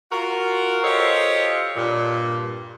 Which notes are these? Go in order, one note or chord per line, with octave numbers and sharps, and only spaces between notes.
F4 F#4 A#4
F4 G4 A4 C5 C#5 D#5
G2 A#2